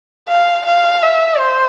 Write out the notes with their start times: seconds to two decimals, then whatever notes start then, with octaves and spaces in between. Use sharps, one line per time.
0.29 F5
0.66 F5
1.03 E5
1.38 C5